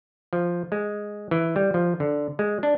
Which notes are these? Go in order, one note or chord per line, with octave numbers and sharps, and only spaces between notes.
F3
G#3
E3
G3
F3
D3
G#3
D4